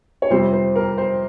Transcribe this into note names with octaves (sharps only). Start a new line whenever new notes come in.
C#5
F2 C3 G3 C4 C5
C5
A#4
C5